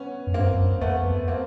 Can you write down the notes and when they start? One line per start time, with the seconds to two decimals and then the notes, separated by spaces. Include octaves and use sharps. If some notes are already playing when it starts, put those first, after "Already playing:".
Already playing: B3 C#4
0.27 F#2
0.34 G2 A#3 C4
0.52 F2
0.57 F#2
0.81 E2 A3 B3
1.05 F2
1.28 A#3 C4